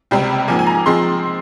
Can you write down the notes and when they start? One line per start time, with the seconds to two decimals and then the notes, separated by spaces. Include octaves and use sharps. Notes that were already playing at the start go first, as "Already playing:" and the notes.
0.11 C#2 C3 G3 C4
0.48 G#2 F3 A#3 G#5
0.59 G#5
0.67 A#5
0.86 F3 G#3 C4 C6